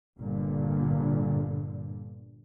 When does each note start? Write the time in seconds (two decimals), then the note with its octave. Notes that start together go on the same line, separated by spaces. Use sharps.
0.19 G1 G2 A#2 D3